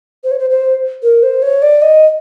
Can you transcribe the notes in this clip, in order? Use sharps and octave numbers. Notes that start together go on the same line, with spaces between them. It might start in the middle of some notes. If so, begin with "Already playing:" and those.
C5
C#5
C5
C5
A#4
C5
C#5
D5
D#5